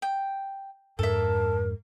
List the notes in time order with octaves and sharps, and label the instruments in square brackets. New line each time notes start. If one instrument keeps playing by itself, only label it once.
[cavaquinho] G5
[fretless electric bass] F2 G#2 D4 [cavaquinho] A4 E5 [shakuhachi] A#4